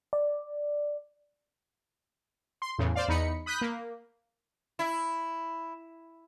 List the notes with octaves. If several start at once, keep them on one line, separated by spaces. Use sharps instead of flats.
D5
C6
E2 A2 C#3
C5 D5 F5
E2 D#4 B5 C#7
B5 D#6 F#6 G6 B6
A#3
E4